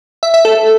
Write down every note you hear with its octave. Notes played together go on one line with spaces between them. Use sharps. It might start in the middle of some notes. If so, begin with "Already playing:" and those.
E5
E5
A4